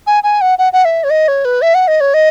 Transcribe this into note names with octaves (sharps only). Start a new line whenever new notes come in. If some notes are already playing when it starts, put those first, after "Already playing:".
G#5
G#5
F#5
F#5
F#5
E5
C#5
D#5
C#5
B4
E5
F#5
D#5
C#5
D#5